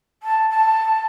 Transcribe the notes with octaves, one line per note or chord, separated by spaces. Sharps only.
A5
A5